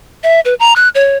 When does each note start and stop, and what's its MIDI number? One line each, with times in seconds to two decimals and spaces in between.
0.24 0.40 76
0.45 0.54 71
0.60 0.73 82
0.76 0.89 90
0.95 1.17 73